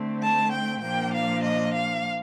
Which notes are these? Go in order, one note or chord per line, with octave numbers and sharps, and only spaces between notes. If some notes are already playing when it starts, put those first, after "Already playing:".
Already playing: D3 A3 C4
A5
G5
A#2 F3 A#3 D4 G5
F5
D#5
F5